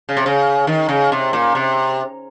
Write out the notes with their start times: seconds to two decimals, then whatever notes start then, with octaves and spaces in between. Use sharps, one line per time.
0.09 C#3
0.17 C3
0.26 C#3
0.67 D#3
0.89 C#3
1.12 C3
1.33 A#2
1.55 C3